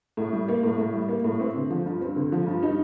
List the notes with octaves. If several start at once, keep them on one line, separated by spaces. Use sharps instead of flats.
A2
G3
A#3
A2
A2
G3
A#3
A2
C4
D3
F3
G2
C4
D3
F3
G2
D#4